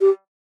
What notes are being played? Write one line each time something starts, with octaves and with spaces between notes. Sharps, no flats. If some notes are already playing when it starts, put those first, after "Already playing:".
G4